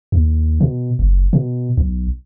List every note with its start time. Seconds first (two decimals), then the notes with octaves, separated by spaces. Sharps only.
0.12 D#2
0.61 B2
0.99 F#1
1.33 B2
1.78 B1